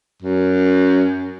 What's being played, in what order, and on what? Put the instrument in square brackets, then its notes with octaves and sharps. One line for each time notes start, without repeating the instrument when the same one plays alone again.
[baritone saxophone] F#2